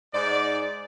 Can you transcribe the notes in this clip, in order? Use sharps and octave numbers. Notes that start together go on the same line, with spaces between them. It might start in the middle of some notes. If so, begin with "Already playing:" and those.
G#2 D5